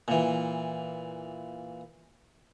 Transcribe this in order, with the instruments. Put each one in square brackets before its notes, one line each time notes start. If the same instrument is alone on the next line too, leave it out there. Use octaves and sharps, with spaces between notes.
[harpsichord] A#2 E3